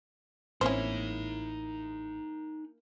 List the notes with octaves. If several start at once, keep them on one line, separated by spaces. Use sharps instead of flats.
A1 A#3 C4 C#4 D#4 E4 C5 G#5